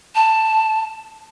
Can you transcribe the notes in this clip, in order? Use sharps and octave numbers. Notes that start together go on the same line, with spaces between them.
A5